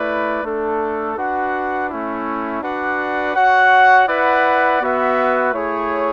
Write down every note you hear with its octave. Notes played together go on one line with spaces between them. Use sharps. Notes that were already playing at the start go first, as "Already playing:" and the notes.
Already playing: A3 E4 B4 D5
A3 D4 A4
D4 F#4 B4 F#5
A3 C#4 E4
D4 F#4 B4 D5 F#5
F#4 C#5 F#5
E4 B4 D5 F#5
B3 F#4 B4 E5
A3 E4 G#4 C#5